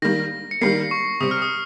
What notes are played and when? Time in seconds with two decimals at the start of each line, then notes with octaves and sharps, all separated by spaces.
0.02 D#3 G3 A#3 A#6
0.51 C#7
0.61 D#3 G3 A#3 C7
0.91 C#6
1.21 C3 G3 C4 D#6
1.31 F6
1.42 D#6